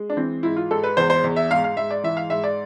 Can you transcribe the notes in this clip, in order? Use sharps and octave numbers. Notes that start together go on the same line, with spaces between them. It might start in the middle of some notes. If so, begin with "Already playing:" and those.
Already playing: G#3
D4
E3 C4
G#2 E4
F4
G#2 A4
B4
E2 C5
C5
E2
E5
G#2 F5
F5
G#2 E5
D5
E3 E5
F5
G#2 E5
D5